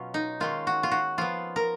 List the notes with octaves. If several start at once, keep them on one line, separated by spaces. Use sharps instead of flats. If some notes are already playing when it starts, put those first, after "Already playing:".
Already playing: B2 F#3 C#4 F4
D#4
D#3 G#3 C#4 F4
F#4
F4
F#4
F3 B3 F4
A#4